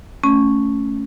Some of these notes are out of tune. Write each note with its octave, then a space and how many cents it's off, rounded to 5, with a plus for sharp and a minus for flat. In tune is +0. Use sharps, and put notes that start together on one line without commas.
A3 +0 C#4 +0